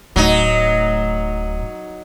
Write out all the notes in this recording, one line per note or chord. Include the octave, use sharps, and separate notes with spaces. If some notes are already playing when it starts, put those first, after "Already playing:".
D1 A2 F#3 D#4